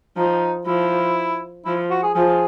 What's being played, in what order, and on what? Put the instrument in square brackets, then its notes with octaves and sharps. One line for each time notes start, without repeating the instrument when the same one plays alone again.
[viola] F3 [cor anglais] D#4
[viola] F3 [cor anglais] E4
[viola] F3 [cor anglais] E4
[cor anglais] F#4
G#4
[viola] F3 [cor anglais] G#4